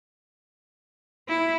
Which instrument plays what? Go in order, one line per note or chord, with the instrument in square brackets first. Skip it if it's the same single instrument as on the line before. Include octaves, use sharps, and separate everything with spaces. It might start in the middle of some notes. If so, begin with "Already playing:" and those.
[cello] E4